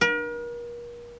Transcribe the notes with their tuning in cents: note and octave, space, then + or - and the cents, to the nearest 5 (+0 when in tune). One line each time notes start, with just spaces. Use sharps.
A#4 +40